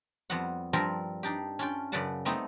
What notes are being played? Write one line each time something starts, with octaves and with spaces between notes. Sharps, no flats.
F2 G3 B3 F#4 F#5
G2 F3 G3 C4 A#4
D4 D#4 G4
C#4 D4 F4 G5
F#2 C#3 B4 D5 F#5 A5
G3 A3 B3 C4 D#4